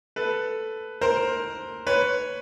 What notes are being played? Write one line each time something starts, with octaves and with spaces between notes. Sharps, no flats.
A4 B4
A#4 C5
B4 C#5